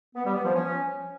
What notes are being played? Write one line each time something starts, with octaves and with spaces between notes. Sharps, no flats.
B3
G3
B3
F3
C#4